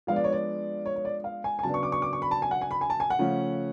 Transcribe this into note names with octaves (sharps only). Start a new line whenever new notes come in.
F3 G#3 B3 D4 F5
D5
C#5
D5
C#5
C#5
D5
F5
G#5
G#5
C#3 F#3 B3 D4 A5
C#6
D6
C#6
D6
C#6
B5
A5
G#5
F#5
G#5
B5
G#5
A5
G#5
F#5
C#3 F3 A3 C#4